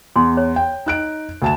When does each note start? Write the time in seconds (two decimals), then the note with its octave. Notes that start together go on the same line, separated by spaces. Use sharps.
0.16 E2 C6
0.37 C#5
0.56 G5
0.86 D#4 F#6 D7
1.42 D2 A5 E7